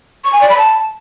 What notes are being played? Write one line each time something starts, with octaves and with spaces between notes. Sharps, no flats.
C#6
G#5
D5
B5
A5